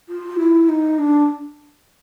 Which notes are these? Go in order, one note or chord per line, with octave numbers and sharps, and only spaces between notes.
F4
E4
D#4
D4